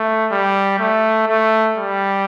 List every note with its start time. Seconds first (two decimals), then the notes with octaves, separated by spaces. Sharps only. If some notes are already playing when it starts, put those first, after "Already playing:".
Already playing: A3
0.31 G3
0.80 A3
1.28 A3
1.78 G3